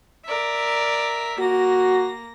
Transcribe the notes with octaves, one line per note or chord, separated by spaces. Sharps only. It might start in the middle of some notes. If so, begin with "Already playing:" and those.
A#4 D5 E5
A#3 F#4 A#6